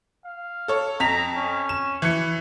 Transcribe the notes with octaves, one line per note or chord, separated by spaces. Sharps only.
F5
A4 C#5
F2 A#5 B6 F7
C#4
E7
E3 G#6 C#7